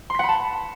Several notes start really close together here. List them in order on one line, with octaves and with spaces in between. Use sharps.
C6 B6 F#5 B5 A5